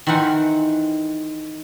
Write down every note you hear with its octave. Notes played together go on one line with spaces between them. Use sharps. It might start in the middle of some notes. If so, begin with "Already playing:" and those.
D#3 E3 C4 A#4 F#5 G#5